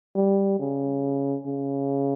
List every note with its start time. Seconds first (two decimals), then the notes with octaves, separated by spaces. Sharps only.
0.15 G3
0.59 C#3
1.46 C#3